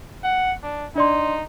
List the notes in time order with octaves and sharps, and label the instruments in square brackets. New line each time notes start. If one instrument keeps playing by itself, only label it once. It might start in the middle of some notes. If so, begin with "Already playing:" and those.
[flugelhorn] F#5
D4
[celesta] D4 D5 C6 [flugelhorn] D#4